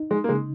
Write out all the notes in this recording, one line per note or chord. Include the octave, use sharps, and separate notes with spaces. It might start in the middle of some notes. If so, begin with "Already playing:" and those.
Already playing: D#4
G#3
A#3
C#3 G#3